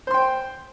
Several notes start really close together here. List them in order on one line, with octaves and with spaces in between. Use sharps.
C5 C6 G5